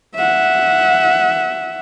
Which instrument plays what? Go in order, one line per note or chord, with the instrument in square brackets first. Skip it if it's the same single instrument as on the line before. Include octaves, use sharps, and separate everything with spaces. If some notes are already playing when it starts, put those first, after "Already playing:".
[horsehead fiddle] E5 F#5